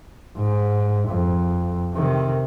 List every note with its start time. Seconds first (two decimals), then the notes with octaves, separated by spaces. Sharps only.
0.37 G#2
1.08 F2
1.93 C3 D#3